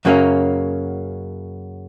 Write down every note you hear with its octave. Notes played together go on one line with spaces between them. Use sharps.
F#2 C#3 F#3 A#3 C#4